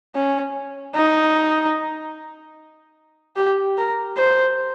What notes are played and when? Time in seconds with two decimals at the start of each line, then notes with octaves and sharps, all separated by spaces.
0.15 C#4
0.95 D#4
3.36 G4
3.78 A#4
4.17 C5